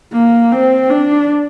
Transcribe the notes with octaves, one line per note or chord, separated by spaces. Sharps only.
A#3
C4
D4